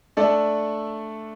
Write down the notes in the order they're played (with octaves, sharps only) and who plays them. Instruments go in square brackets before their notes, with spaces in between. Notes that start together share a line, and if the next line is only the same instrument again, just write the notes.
[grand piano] A3 D4 A4 D5